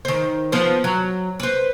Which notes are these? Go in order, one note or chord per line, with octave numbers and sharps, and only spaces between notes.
D#3 C5
F3 B3 C5
F#3
B4 C5